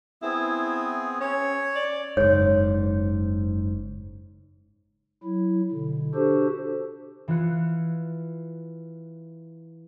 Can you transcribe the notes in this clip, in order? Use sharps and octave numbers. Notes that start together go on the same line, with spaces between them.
B3 C4 E4 G#4
C#4 C#5
D5
F#1 G#2 C#5
F#3 E4
B2 D3
D4 F#4 G4 A4 C5
E3 F4 F#6 C#7